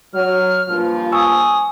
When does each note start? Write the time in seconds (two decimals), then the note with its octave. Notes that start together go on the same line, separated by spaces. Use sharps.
0.14 F#3 F6
0.68 G2 A#2 F3
1.12 G#5 C#6 D#6 E6